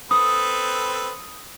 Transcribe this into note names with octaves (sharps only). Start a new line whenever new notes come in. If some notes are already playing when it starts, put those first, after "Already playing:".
C4 A4 B4 D#6